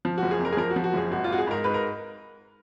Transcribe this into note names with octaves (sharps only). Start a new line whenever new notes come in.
F3
F#1 F#4
G#4
F2
A#4
G#4
F3 A#4
F#4
F3
F#4
F#1 G#4
G#1 F#4
F4
G#1 F#4
G#4
G#2 A#4
G#2 B4
A#4